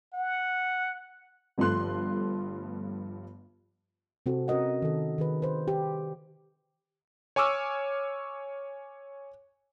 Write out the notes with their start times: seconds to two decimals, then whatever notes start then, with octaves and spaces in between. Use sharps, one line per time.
0.14 F#5
1.58 G1 G2 F3 A3 C6 F#6
4.26 C3 C4 F#4 A4
4.48 C#4 F#4 A#4 D#5 F#5
4.82 D#3 A4
5.18 D#3 G#4 B4
5.42 B4 C5
5.68 G4
7.36 C#5 G#5 C#6 D6 E6 F6